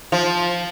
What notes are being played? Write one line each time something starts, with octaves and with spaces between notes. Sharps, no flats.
F3